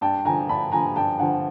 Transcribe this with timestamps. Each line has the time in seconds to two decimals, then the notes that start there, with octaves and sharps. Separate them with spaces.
0.01 G2 G5 A5
0.25 D3 F3 G#5 A#5
0.49 G2 A5 B5
0.72 D3 F3 G#5 A#5
0.96 G2 G5 A5
1.19 D3 F3 F#5 G#5